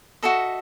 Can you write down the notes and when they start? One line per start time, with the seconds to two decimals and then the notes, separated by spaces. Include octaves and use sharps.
0.23 F#4 A4 D#5 E5